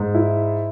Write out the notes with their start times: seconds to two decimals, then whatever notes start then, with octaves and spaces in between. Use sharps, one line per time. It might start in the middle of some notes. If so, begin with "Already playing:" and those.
Already playing: G#2
0.15 E4